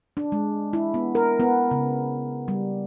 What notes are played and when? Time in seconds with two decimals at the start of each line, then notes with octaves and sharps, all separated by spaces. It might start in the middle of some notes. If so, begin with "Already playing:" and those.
0.17 D4
0.32 G#3
0.73 E4
0.94 B3
1.15 A#4
1.40 B3
1.71 C#3
2.48 G3